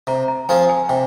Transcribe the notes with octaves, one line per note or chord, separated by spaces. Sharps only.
C3 A#5
A#5
F3 C4 F4 G#4 G#5
G#5
C3 G5